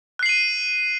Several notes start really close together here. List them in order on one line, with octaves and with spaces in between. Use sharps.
F#6 C7 F#7 D#7